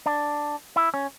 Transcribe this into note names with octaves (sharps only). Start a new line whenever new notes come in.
D4
E4
C#4